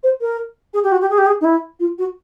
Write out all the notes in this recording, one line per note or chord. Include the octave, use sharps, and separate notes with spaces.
C5
A#4
G#4
G4
F#4
G4
G#4
G4
G#4
D#4
E4
F4
F#4